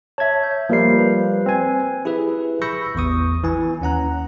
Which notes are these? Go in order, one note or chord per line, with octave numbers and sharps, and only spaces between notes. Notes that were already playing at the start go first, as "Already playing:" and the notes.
C#5 E5 A5 G#6
G6
F3 G3 A#3 A#4 C7
B4
C4 G#5
E4 G4 G#4 B4 E5
B5 C#6 E6 G6 A#6 C#7
A1 E2 C#6 D#6
E3 G#5
D#2 C#4 F#5 A#5 F#6